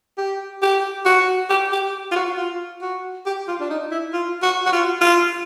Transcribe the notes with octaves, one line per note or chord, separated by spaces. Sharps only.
G4
G4
F#4
G4
G4
F4
F#4
F4
F#4
G4
F4
D4
D#4
E4
F4
F#4
F#4
F4
F4